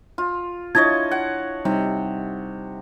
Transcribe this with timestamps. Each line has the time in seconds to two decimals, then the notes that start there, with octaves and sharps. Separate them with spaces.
0.18 F4
0.75 D4 E4 F4 C#5 D#5 A5 G#6
1.11 F#5
1.65 C3 G3 D#4